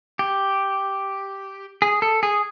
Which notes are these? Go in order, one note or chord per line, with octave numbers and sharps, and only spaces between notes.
G4
G#4
A4
G#4